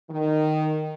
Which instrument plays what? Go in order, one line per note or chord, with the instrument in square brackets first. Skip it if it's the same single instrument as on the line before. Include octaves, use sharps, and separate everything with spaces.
[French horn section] D#3